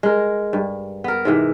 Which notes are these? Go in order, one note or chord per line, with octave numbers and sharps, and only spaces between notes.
G#3 A#4
G2
B3 A#4
G#2 C3 E3